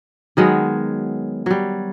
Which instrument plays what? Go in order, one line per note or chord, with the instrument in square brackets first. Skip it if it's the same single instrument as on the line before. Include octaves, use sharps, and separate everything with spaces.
[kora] D#3 F#3 G#3 B3
F#3 G3